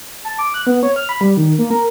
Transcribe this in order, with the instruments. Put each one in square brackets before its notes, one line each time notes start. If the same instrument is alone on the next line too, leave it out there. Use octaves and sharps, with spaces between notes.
[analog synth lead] A5
D6
F#6
B3
C#5
F6
B5
G3
D#3
A#3
A#4